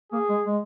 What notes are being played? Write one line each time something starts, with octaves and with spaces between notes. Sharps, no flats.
A#3 G#4
G#3
G#3